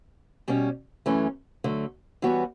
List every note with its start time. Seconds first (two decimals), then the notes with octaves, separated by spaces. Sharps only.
0.48 B2 G3 C#4
1.06 F#2 E3 A3 C#4
1.64 D3 F#3 A3
2.22 E3 G3 B3 F#4 C#5